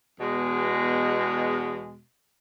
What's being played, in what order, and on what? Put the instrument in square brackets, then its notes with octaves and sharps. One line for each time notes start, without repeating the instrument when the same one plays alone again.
[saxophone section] E2 B2 G#3